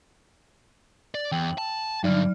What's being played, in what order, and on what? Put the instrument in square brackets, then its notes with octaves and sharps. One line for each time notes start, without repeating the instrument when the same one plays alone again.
[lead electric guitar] D5
[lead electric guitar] E2 [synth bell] G5 F#7
[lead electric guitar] A5
[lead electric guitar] G2 D3 [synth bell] F#3 D5 F6